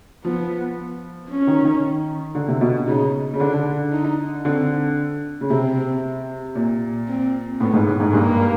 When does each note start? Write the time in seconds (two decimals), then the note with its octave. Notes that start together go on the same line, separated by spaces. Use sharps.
0.24 F3 B3
1.29 C#4
1.47 D#3
1.64 D#3
2.35 D3
2.48 C3
2.61 B2
2.87 C#3 D#4
3.34 C#3
3.40 D3 D4
3.93 D#4
4.45 D3 C4
5.41 C#3
5.50 C3 C4
6.55 A#2
7.08 C4
7.60 A2 B3
7.74 G#2
7.87 A2
8.00 G#2
8.13 G2 A#3